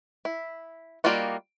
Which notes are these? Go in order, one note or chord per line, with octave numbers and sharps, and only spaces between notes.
E4
G3 A#3 D#4 F4 F#4